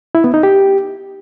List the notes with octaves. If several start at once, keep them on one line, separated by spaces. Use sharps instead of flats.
E4
B3
D#4
G4